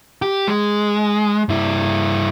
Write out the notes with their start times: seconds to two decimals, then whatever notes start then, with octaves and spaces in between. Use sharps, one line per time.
0.22 G4
0.48 G#3
1.49 G2 E4